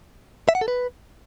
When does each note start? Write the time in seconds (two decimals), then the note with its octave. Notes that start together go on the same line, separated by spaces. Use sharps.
0.49 E5
0.55 F#5
0.61 A4
0.68 B4